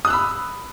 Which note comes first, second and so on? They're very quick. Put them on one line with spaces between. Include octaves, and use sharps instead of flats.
D#6 F#6 E6 B5